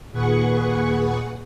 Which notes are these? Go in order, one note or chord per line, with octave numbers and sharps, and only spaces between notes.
D#2 A#2 G#4 B4 F#5 C#6